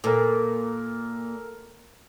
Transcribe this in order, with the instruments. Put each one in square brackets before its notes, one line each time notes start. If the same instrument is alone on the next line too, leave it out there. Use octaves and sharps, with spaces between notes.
[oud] A#2 [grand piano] A4 A#4